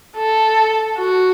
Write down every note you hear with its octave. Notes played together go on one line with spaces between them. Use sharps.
A4
F#4